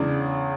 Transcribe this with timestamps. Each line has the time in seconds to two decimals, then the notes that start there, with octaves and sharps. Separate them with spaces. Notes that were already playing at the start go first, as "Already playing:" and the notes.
Already playing: E2 C#3 G#3 D4